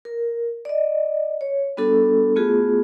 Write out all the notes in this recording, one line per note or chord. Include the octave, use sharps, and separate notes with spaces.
A#4
D5 D#5
C#5
G3 B3 D4 F#4 A4
A3 B3 F4 F#4 G#4